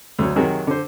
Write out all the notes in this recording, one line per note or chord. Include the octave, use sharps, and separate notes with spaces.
D2 F#3
C3 D#3 F#3 F#4 G#4
D3 C5